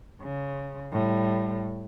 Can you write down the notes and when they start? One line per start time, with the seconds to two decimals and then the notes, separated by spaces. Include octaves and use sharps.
0.21 C#3
0.92 A2 G3